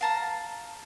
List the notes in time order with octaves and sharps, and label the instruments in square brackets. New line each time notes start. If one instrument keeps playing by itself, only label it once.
[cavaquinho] F5 A5 A#5